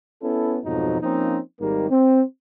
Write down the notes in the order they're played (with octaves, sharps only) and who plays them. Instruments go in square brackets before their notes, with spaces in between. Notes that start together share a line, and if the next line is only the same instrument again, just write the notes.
[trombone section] B3 C#4 E4 A4
F2 G#2 B2 F3 F#3 D#4
F3 A#3 C4 C#4 D#4
G#1 G#2 D#3 G3 A#3
C4